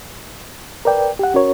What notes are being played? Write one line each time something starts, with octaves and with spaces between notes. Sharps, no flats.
A#4 B4 D5 G5
G4 F#5
C#4 F#4 A#4 C#5